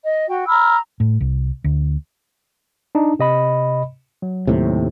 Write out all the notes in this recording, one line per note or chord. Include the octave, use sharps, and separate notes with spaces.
D#5
F#4 G5
A#5 B5 E6 F6
A2
C2
D2
D4 D#4
C3 D#5 B5
F#3
D#2 A2 C3